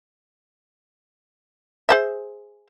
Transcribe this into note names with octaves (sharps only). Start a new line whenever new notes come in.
G#4 C5 E5